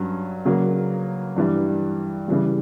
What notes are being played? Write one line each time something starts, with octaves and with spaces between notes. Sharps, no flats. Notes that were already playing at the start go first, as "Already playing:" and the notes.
Already playing: G2 F#3 C#4
C#3 F#3 A#3
G2 E3 G3
C#3 E3 G3